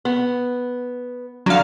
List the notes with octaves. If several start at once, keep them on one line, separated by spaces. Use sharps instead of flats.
B3
D3 F#3 F5